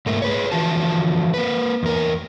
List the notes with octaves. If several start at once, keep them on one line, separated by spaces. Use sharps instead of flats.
G#2 A3 A#3
G#4 B4 C#5
D3 E3 F3 F#4 A5
A#3 B4
E2 A#4